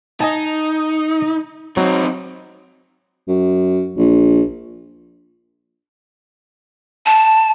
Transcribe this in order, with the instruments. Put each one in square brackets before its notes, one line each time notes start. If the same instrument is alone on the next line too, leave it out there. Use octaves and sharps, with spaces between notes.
[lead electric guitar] D#4 [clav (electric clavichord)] D#5 G#5 A5
[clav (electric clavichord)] F#3 [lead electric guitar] C4 D#4
[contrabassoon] F#2
A#1
[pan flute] A5